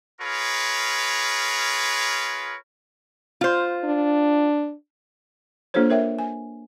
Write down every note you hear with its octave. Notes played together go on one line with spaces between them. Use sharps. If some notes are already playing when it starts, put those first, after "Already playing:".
F4 G#4 A#4 B4 C#5
F4 C5
D4
A#3 D4 F4 A4 C5 C#5
A#4 C#5 E5 G5
G#5